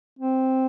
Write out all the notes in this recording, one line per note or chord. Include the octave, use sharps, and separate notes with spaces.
C4